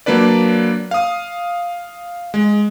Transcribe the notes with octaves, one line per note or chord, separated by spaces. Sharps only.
F#3 A#3 D4 B4 D5
F5 D#6
G#3